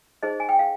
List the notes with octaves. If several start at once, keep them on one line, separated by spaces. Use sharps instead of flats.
D#4 G#4 C5 D#5
G#5
G5
F5